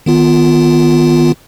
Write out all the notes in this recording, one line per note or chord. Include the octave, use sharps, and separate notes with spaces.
D#3 B3 F4